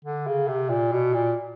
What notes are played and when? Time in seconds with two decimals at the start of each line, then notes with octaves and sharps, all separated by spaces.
0.05 D3
0.27 C#3
0.48 C3
0.70 A#2
0.92 B2
1.14 A#2